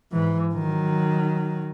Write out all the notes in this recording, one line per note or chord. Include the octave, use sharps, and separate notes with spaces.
G#2 E3
D#3 F#3